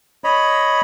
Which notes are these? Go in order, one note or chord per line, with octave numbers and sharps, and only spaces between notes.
C#5 D#5 B5